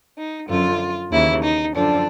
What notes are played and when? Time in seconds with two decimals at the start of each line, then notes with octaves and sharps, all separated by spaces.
0.17 D#4
0.48 F#2 D3 F3 F4
1.12 D#2 C#3 E3 E4
1.43 D#4
1.74 F#2 D3 F3 D4